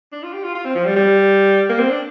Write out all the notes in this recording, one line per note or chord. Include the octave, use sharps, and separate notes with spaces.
D4
F4
G4
F4
F4
C4
F3
G3
G3
A#3
C4
D4